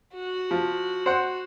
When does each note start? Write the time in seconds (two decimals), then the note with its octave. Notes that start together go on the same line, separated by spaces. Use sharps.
0.15 F#4
0.51 F3
1.06 C5 F#5